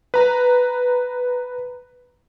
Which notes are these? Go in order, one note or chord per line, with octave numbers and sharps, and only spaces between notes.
B4 A#5